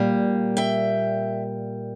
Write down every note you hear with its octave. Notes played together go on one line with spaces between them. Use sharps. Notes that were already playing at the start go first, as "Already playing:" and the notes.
Already playing: A#2 G3 A#3
E5 G5